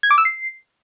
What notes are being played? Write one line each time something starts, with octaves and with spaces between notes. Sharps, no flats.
G#6
D6
E6
C7